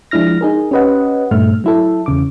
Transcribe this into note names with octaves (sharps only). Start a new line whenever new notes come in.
F3 G#3 D4 E4 F6 A#6
D#4 G#4 A#4
C#4 G4 B4 D#5 F#5
G2 A#2 A3 E5 F6
F#3 E4 A4
E2 C#3 D6